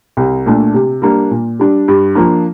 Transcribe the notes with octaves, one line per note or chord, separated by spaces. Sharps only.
C2
A#2 A3 D4
C3
G3 A#3 D4
A#2
G3 D4
G2
F3 A#3 D4